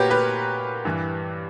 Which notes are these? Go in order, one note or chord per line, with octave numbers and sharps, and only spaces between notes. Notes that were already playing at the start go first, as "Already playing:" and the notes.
Already playing: A#2 F#4 G4 A#4 B4 C#5
G4 B4
G2 E3